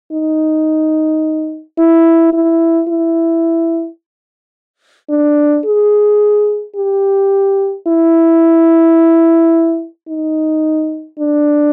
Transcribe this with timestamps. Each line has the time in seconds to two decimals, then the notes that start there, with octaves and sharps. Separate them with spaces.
0.12 D#4
1.78 E4
2.33 E4
2.89 E4
5.10 D4
5.65 G#4
6.76 G4
7.87 E4
10.08 D#4
11.19 D4